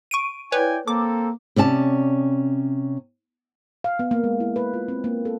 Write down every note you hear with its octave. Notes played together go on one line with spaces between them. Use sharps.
C#6 D7 D#7
E4 B4 C#5 D5 G5 G#5
A#3 C4 A4 D6
C3 C#4 D5 A5
F5
B3
A#3
G#3
E4
B4
F4
C4
A#3
A4